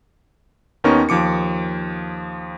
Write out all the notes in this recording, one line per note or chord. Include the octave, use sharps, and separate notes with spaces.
D#2 B3 C#4 D#4 A#4 C#6
D#2 F3 D6 C#7